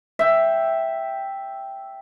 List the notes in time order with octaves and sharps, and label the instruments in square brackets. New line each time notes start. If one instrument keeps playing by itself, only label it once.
[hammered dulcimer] E5 G5